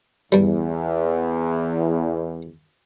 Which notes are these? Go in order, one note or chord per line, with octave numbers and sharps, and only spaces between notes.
E2 G2 G3